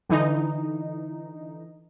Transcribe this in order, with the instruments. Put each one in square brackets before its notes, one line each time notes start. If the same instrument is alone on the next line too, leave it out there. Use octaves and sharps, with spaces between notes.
[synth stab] D3 E3 D#4